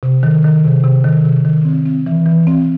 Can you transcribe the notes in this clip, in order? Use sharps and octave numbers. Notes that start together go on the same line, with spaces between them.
C3
D#3
D#3
C3
C3
D#3
C3
D#3
C4
C4
E3
E3
C4